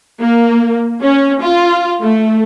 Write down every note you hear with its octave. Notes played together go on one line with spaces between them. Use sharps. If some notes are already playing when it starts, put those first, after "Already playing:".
A#3
C#4
F4
A3